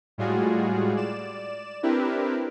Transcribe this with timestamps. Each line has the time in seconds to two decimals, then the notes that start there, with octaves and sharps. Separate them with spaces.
0.18 A2 G3 G#3 F4 F#4 G#4
0.96 D5 E7
1.83 C4 D4 E4 G4 A#4 B4